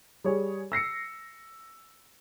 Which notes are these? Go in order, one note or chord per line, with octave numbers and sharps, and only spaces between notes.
G3 G#4 C#5
E6 A#6 C7 C#7